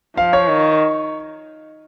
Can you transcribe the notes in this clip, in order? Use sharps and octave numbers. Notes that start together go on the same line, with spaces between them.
F3 F5
C#5
D#3